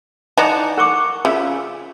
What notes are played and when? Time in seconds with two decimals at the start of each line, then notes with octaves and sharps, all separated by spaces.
0.38 E3 D#4 D5 D#5 F#5 A5 A#5
0.78 A#4 F#5 C#6 D6
1.25 C#3 F4 E5